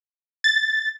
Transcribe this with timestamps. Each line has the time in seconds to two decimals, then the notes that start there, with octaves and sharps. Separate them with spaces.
0.44 A6